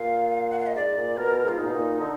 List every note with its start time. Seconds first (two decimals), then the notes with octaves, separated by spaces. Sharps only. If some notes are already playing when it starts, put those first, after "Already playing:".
Already playing: A#2 F5
0.51 F#5
0.59 F5
0.67 D#5
0.75 G#2 D5
0.97 A#2
1.17 B2 A#4
1.31 B2
1.44 G#2 F4
1.58 A#2 D#4
1.67 B2
1.74 A#2
2.00 D3